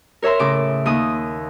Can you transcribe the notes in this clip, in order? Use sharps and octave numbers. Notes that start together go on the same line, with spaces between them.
A#4 C#5 E5 A#5 C6
A2 C#3 D6
D#2 D#6